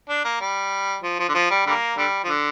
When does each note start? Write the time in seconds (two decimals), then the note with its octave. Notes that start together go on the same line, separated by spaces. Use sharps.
0.09 D4
0.25 A#3
0.40 G3
1.03 F3
1.19 F3
1.29 D3
1.34 F3
1.50 G3
1.66 D3 G3 A#3
1.97 D3 G3
2.24 F3
2.28 D3